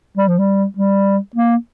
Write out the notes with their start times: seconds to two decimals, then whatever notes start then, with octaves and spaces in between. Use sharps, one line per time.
0.18 G3
0.28 F3
0.39 G3
0.77 G3
1.35 A#3